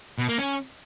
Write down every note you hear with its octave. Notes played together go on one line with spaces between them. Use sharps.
B2
A#3
C#4